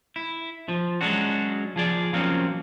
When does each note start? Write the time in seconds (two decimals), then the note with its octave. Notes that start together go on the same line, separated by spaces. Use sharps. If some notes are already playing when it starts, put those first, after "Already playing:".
0.16 E4
0.68 F3
1.01 F#3 G#3 C#4 D4 F#4
1.76 F3 G#4 D5
2.13 F3 F#3 A#3 C4 C#4